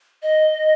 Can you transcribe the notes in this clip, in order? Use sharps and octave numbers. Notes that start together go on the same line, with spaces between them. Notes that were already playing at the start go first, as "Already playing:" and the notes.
D#5